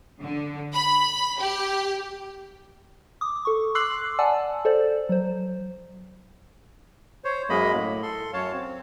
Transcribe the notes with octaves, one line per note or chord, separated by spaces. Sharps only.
D3
B5
G4
D6 D#6
A4 C#6
C6 D6 E6 F#6 C7 F#7
D5 F#5 G#5 A5 E6
A4 C5 D5
F#3 C5
C5 C#5
F#2 G#3 A#3 D#5 B5
A2
A4 C6
F#2 C#5 F5 A5
C4